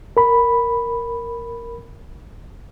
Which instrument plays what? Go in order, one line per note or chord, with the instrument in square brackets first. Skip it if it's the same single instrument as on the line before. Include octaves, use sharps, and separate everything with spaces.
[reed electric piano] A#4 B5